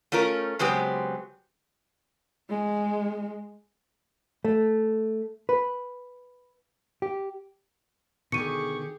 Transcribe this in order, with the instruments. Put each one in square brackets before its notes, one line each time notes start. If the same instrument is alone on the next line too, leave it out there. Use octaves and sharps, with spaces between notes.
[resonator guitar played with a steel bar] A3 C#4 F4 A#4
C#3 F#3 G#3 B3 C4 G4
[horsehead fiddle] G#3
[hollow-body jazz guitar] A3
B4
G4
[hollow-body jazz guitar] B2 D3 D#3 [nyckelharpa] G4 G#4 [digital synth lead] C#6 [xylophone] C#7 D#7